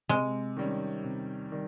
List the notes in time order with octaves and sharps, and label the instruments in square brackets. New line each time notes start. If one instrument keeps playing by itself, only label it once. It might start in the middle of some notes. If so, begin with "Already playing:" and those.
[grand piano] C3 [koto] G#3
[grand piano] D#3 G3 C#4
C3
D#3 G3